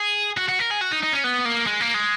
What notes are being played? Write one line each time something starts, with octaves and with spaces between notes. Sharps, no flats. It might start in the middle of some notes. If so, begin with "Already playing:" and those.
Already playing: G#4
F#4
F#4
A#4
G#4
F#4
D#4
D#4
C#4
B3
A#3
G#3
A#3
G#3